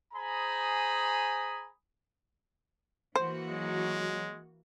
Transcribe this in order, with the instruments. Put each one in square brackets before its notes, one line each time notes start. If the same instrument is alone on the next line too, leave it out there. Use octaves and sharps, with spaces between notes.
[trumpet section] G#4 C5 G#5 A#5 B5 D#6
[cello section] E3 A#3 F#4 [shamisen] C5
[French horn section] F#3 [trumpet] G#3